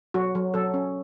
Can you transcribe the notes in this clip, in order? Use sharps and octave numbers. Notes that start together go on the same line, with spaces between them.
F#3 F#4
F#3
F#3 A4
C#4